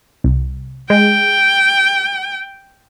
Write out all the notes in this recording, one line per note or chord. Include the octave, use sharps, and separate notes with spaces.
C2
G#3 G5